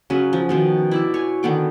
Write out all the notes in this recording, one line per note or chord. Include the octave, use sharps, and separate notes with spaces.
C#3 F#3 C#4 B4
F3
B2 D#3 F3
E4 D5 E5
C#5 G#5
D3 D#3 B3 D6